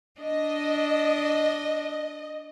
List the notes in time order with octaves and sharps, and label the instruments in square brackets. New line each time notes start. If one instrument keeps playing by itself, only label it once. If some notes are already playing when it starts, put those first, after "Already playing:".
[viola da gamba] D4 [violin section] D#5